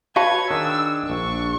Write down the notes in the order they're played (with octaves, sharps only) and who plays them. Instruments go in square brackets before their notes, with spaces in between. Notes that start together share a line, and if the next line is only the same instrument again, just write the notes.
[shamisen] F#4 F5 A5 [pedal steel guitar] B4 C#5 [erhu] G#6
[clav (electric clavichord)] D#3 G#4 [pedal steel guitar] D4 [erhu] E6
[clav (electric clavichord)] A#1 [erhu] C#6